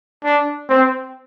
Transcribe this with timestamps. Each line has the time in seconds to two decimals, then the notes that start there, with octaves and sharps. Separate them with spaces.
0.24 D4
0.69 C4